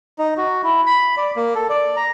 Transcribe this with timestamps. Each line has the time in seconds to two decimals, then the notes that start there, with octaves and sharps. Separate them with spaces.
0.19 D#4
0.37 F#4
0.64 E4
0.86 B5
1.17 D5
1.36 A#3
1.55 A4
1.70 D5
1.96 A#5